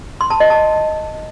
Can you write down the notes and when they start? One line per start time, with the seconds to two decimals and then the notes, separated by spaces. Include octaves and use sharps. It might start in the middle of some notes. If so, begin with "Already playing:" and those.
0.21 C6
0.30 A5
0.40 D#5
0.50 A5